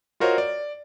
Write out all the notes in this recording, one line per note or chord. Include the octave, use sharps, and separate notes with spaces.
F4 F#4 A#4 C5 C#5 D#5
D5